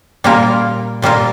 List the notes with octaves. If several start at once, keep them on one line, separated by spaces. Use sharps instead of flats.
A#2 G3 A#3 F4 A#4
A#2 G3 A#3 F4 A#4